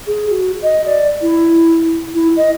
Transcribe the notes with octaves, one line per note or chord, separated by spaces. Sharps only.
G#4
F#4
D#5
D5
E4
E4
D#5